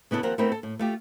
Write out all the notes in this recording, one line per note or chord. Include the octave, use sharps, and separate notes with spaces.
C#3 B3 E4 A4
D#2 F3 C4 A#4 F#5
A3 B3 C4 E4 A#4
A4
A2
A3 F4 G4